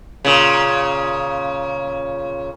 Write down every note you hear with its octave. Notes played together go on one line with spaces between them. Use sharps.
A#2 C#3